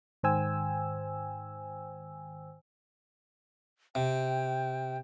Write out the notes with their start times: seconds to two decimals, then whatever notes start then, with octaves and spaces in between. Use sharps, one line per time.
0.23 G#2 D#3 C5 G5 G#5 E6
3.95 C3 G5